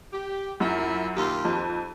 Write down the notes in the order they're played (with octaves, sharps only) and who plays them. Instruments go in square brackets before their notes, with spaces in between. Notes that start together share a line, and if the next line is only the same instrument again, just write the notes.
[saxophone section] G4
[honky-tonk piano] F#2 [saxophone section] E4 F4
[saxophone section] D#2 F4 G4
[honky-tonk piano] F2